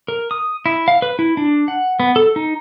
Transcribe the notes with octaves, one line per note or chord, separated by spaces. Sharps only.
A#4
D#6
E4
F5
B4
E4
D4
F#5
B3
A4
D#4